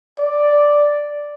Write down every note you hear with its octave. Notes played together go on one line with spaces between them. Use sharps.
D5